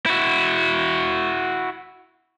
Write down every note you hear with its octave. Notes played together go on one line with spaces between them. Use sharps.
E4 F#4